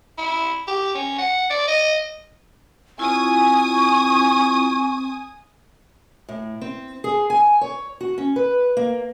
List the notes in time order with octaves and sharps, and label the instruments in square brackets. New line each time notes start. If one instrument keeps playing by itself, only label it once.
[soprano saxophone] E4
G4
C#4
F#5
D5
D#5
[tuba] C4 [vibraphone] E4 F4 [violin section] G#5 D#6 [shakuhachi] C#6
[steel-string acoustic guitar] A2
C4
G#4
G#5
C#5
F#4
C#4
B4
A#3